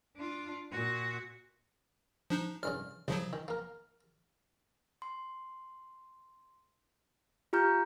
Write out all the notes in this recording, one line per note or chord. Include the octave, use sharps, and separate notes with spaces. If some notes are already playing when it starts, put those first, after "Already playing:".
D4 F4
A#2 F#4
F3 D4 D#4
C2 G2 C#3 F6
C2 C#3 F3 F#3
D#3
A#3 A#4
C6
F4 G4 A#5 F6 G6